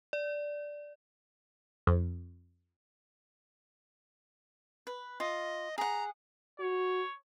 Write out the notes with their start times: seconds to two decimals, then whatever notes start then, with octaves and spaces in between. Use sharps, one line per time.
0.13 D5
1.87 F2
4.87 B4
5.20 F4 D#5
5.78 G#4 F#5 A#5
6.60 F#4 C#5